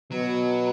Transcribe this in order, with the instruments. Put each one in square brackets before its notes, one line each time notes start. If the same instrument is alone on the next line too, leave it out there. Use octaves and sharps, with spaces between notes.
[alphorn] B2 [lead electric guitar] F#3